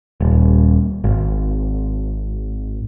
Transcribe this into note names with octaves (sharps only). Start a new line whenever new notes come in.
D#1
G#1